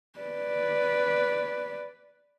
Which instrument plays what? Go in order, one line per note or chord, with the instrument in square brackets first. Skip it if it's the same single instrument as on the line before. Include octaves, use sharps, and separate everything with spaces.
[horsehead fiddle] B4 D5